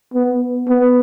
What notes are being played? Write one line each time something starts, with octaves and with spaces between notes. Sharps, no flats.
B3
B3